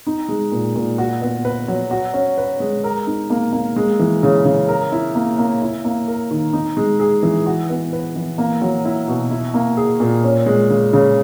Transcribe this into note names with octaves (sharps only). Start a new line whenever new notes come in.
D#4
G#3
A#2
A#2
F#4
B3
B4
F#3
F#4
C#4
B4
G#3
A#4
D#4
A#3
A#3
G#3
E3
C#3
C#3
A#4
E4
A#3
A#3
E4
A#3
A#4
D#3
D#4
G#3
G#4
E3
F#4
B3
B4
E3
A#3
F#3
E4
B2
E4
A#3
G#4
A#2
C#4
G#3
C#3
C#3